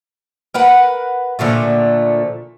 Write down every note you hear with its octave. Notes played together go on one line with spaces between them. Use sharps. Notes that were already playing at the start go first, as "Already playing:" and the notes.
A#4 B4 F#5
A#2 D3 F3 A3